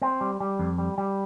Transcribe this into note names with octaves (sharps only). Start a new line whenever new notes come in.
C4
G3
G3
F2
G3
G3